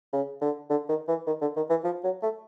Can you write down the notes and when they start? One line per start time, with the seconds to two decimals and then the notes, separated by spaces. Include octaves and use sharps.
0.13 C#3
0.41 D3
0.70 D3
0.89 D#3
1.08 E3
1.27 D#3
1.41 D3
1.56 D#3
1.70 E3
1.84 F3
2.04 F#3
2.22 A3